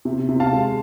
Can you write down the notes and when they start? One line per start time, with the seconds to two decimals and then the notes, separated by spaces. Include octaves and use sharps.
0.05 C3
0.29 C3
0.40 F5 A5
0.53 G#3